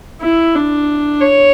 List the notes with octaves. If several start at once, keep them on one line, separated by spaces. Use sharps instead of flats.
E4
D4
C#5